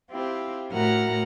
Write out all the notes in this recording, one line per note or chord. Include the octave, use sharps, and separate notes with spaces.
C4 E4 F4 G4
A2 F#4 A#4 F#5 F6